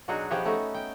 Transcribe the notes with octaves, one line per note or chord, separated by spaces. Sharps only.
B2 F#3 D4 D#4 F#4 G#4
F3 B3 G4 G#4 C#5
A3 C#4 D#4 F#4
G5